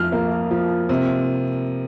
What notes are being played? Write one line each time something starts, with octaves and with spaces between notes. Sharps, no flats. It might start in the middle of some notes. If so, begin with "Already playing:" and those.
Already playing: F2 F3 F6
A#3
F3
C3